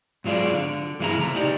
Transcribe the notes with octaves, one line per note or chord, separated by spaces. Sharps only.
G#2 F#3 F4 G#4 D5
D3
G2 E3 A#3 E4 G#4 A#5
C#3 A#3 A#5
D#4 G4 D5